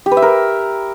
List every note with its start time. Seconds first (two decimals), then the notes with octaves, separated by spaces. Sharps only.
0.06 G4
0.11 B4
0.17 E5
0.22 A#4